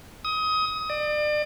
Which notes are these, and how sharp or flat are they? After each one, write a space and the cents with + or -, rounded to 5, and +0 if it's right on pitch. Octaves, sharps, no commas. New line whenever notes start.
D#6 +25
D5 +35